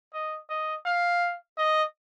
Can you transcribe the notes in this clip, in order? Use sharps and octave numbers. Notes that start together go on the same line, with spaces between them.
D#5
D#5
F5
D#5